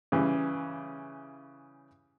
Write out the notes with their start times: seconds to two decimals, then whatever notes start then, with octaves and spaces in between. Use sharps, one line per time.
0.12 C#3 E3 G3